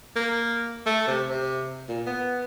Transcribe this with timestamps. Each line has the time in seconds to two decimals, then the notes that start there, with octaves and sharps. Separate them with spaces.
0.16 A#3
0.86 A3
1.07 C3
1.29 C3
1.89 A#2
2.06 B3